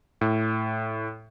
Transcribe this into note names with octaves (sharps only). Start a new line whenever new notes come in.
A2